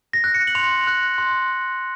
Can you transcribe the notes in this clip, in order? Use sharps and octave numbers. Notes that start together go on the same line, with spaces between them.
A#6
F#6
C#7
F#7
C6 F7
F#6
C6